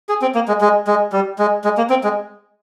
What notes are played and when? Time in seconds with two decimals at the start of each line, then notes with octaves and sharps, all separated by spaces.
0.09 G#4
0.22 C4
0.35 A#3
0.48 G#3
0.61 G#3
0.87 G#3
1.12 G3
1.39 G#3
1.64 G#3
1.78 A#3
1.90 C4
2.04 G#3